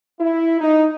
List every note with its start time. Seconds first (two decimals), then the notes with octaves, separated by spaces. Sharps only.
0.20 E4
0.61 D#4